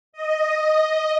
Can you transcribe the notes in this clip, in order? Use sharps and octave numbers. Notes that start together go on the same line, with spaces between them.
D#5